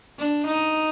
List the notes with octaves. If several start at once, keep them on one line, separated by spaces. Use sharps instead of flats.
D4
D#4